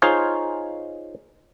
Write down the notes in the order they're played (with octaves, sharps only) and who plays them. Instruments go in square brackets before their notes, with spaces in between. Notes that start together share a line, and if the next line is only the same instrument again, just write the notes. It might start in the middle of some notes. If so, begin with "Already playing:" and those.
[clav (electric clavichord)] D#4 F4 G#4 C5 C#5 F5